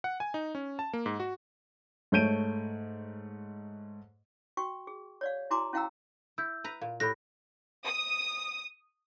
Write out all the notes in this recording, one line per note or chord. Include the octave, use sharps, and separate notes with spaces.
F#5
G#5
D#4
C#4
A5
A#3
G#2
F#4
G#2 A3 C#5 G6 D7 D#7
F#4 G5 C#6
G#4
C#5 D5 F5
E4 F#4 G#5 A#5 C6 D6
C#4 E4 F5 G5 A#5 E6
E4 E6 G6
B4 A#5
A#2 F5
A2 G4 B5 F#6 A#6
D#6